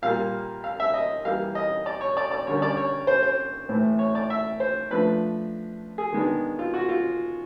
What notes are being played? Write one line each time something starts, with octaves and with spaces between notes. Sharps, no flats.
A#2 G3 A#3 F5
F5
E5
D#5
E3 G3 A#3 F5
D#5
D5
C#5
D5
D5
D3 G3 A#3 C#4 C#5
D5
C#5
C5
C5
A2 E3 A3 C4
C#5
D5
E5
C5
F3 A3 D4 B4
G#4
D#3 G#3 B3 D4
F4
F#4
F4